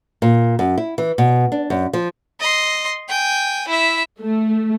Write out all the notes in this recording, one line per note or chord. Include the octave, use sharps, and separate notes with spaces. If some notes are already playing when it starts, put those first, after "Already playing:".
A#2
F#2
E4
E3
B2
D4
F#2
F3
D#5 C6
G5 G#5
E4 E5
A3